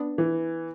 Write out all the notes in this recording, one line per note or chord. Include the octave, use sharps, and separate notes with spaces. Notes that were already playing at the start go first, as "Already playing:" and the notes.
Already playing: B3 D4
E3